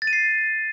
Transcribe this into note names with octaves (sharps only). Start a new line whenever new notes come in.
A6
D#7
C7